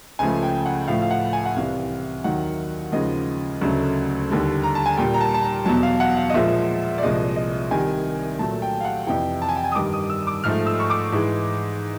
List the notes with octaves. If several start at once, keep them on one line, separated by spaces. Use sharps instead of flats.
C#2 C#3 F3 A3 G#5
G5
F#5
A2 F3 A3 F5
F5
F#5
G#5
F#5
C2 C3 E3 F5
D#2 D#3 F#3 F#5
D#2 C#3 F3 G#3 D#5
D2 C#3 F#3 A3
D#2 D3 G3
A#5
A5
G#5
A#2 G3 G5
A#5
A5
A5
A#5
E2 B2 F#3 A5
F5
F#5
F5
D#5
A#2 F3 G#3 E5
D5
C2 A#2 F3 G#3 D#5
D#5
C2 C3 D#3 G3 G#5
A#2 F#3 A3 A5
G5
F5
F#5
F2 C3 E3 G5
A5
G#5
G5
G#5
D#6
G2 D#3 G3 D6
D#6
E6
D6
G#2 F3 A3 F6
E6
C#6
D6
G#2 E3 G#3